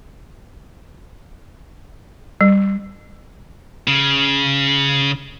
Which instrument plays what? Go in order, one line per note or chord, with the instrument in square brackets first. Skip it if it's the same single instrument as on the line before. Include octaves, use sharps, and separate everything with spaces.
[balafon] G3
[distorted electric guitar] C#3